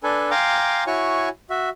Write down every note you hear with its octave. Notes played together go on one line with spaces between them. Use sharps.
D4 A4 B4 G#5
F5 G5 G#5 A#5 C6 D6
E4 F#4 C#5 G#5 C#6
F#4 E5